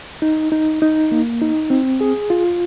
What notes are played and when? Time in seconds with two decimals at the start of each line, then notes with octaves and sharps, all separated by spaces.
0.22 D#4
0.52 D#4
0.82 D#4
1.12 A#3
1.42 D#4
1.70 C4
2.01 G#4
2.30 F4